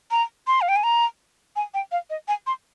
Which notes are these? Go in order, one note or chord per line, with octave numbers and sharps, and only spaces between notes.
A#5
C6
F5
G5
G#5
A#5
G#5
G5
F5
D#5
G#5
C6